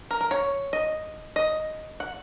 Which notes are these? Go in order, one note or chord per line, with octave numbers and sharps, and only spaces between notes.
A#4
A#4
C#5
D#5
D#5
F#5